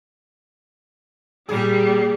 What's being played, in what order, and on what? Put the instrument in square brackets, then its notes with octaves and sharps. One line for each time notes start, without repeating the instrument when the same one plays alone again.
[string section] A#2 G3 [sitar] G#4